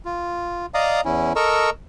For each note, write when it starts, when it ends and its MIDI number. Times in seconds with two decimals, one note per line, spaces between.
0.05 0.66 65
0.74 1.01 74
0.74 1.01 75
0.74 1.01 77
0.74 1.01 82
0.74 1.01 87
1.05 1.33 40
1.05 1.33 61
1.05 1.33 64
1.36 1.70 69
1.36 1.70 70
1.36 1.70 75
1.36 1.70 82
1.36 1.70 85
1.36 1.70 88